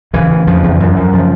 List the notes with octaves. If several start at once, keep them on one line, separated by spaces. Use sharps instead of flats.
E2 C#3 E3
C#3
F2 C#3 F3
E2
F#2
F#2
C#3 F3